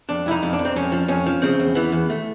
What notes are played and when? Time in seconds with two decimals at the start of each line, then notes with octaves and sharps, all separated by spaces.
0.09 F2 D4
0.26 F2 E4
0.31 D#4
0.43 F2
0.53 D4
0.59 F2
0.65 C4
0.76 F2 C#4
0.92 F3
1.08 F2 C#4
1.26 F3
1.42 C#3 C4
1.60 E2
1.75 E3 B3
1.92 E2
2.10 A3